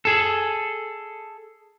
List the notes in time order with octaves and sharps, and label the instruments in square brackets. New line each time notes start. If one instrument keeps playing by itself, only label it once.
[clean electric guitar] G#4 A4